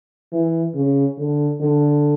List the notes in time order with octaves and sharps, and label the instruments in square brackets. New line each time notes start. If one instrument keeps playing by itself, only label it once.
[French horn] E3
C#3
D3
D3